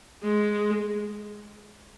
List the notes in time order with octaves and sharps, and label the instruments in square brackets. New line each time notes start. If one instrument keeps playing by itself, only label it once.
[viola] G#3